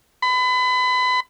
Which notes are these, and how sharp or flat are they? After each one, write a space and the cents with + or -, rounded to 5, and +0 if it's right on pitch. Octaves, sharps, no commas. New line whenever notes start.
B5 +30